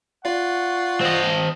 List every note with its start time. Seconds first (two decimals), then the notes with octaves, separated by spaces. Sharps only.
0.25 F4 D5 F5 F#5 C#6
1.01 C4 D#5